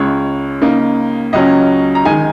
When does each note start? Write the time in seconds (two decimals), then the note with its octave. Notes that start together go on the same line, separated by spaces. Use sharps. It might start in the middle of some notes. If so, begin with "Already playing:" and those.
Already playing: C#2 C#3 G#3 C#5
0.62 C#3 A#3 D#4
1.33 C#2 C#3 F#3 C#4 D#5
1.95 A#5
2.05 D#3 G#3 D#4 G#5